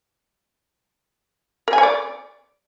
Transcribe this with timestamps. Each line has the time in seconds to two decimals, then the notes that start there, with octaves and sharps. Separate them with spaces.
1.68 A#4
1.73 G#5
1.78 C#5
1.83 D5